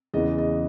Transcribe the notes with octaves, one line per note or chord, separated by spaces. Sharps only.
E2 C#3 E3 B3 D#5
D#5